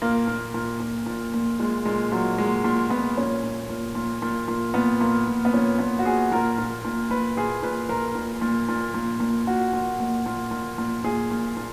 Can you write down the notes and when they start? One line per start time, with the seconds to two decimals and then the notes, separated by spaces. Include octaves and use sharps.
0.02 A#2 A#3
0.28 A#2
0.54 A#2
0.80 A#2
1.06 A#2
1.34 A#2
1.59 A#2 G#3
1.85 A#2 G#3
2.12 A#2 F#3
2.38 A#2 G#3
2.64 A#2
2.90 A#2 B3
3.17 A#2 C#4
3.43 A#2
3.69 A#2
3.95 A#2
4.22 A#2
4.48 A#2
4.74 A#2 B3
5.01 A#2 A#3
5.27 A#2
5.45 B3
5.53 A#2 C#4
5.79 A#2 B3
5.99 F#4
6.06 A#2 G#4
6.32 A#2 A#4
6.58 A#2
6.85 A#2
7.10 A#2 B4
7.37 A#2 G#4
7.62 A#2 B4
7.89 A#2 A#4
8.15 A#2
8.41 A#2
8.69 A#2
8.94 A#2
9.20 A#2
9.47 A#2 F#4
9.73 A#2
10.00 A#2
10.26 A#2
10.51 A#2
10.78 A#2
11.04 A#2 G#4
11.31 A#2
11.57 A#2